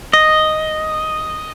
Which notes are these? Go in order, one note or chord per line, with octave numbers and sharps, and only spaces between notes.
D#5